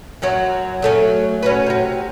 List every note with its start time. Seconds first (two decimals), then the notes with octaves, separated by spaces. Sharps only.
0.22 F#2 F#3 F#4
0.82 F#3 A3 C#4
1.43 C#4 F#4 B4
1.67 C3 F#4